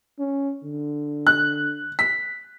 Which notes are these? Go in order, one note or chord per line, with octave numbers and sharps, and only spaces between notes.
C#4
D3
F#6
B6